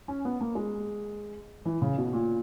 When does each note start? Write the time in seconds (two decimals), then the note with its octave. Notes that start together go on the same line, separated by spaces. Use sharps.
0.08 C#4
0.25 B3
0.41 A#3
0.55 G#3
1.65 E3
1.82 C#3
1.98 B2
2.13 A#2